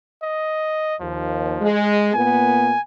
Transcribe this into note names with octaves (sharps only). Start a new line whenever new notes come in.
D#5
D#2 F3
G#3
A#2 A#3 B3 G#5